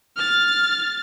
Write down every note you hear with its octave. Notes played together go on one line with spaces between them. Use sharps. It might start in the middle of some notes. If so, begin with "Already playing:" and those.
F6 A6